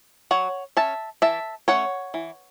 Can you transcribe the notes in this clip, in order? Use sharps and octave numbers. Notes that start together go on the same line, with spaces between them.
F#3 C#5 F#5
C#4 E5 A5
E3 E5 A5
A3 C#4 C#5 F#5
E3